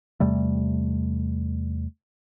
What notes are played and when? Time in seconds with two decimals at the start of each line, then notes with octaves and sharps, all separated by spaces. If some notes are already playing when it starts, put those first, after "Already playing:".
0.20 E2 C3 G3 A3